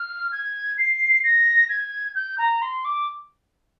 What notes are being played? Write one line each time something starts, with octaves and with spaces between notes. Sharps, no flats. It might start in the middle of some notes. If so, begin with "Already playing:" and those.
Already playing: F6
G#6
C7
A#6
G#6
G6
A#5
C6
D6